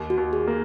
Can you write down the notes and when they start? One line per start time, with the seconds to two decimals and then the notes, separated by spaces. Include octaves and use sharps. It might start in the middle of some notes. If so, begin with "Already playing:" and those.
Already playing: D#2
0.10 F#4
0.17 D#2
0.33 G#4
0.47 A#3